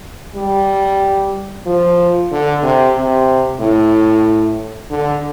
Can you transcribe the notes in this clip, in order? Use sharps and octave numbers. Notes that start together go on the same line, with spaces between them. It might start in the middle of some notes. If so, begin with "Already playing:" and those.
G3
F3
D3
C3
C3
A2
D3